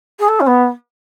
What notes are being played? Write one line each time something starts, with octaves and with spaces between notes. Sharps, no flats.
G#4
A4
C#4
B3